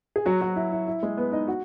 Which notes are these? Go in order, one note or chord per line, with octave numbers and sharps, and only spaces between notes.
G#4
F#3 F#4
F#3 F#4
E4
E4
E4
G#3 G#4
B3 B4
D#4 D#5
F#4 F#5